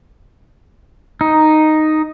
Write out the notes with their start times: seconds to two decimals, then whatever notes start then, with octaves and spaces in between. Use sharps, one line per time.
1.21 D#4